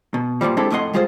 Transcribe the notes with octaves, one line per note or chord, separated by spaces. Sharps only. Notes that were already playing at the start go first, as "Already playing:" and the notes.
B2
G2 A#2 C#3 F3 G3
G#3 C4 D4 E4 G4 A4
F2 A2 A3 D#5 F#5 C6
G3 G#3 F4 G#4 C5 F5